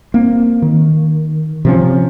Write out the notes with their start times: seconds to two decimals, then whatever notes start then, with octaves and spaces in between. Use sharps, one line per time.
0.14 A#3 C4
0.62 D#3
1.65 C3 F3 C#4